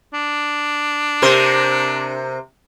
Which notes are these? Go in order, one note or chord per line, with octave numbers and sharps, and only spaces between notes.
D4
C3 A#4 C5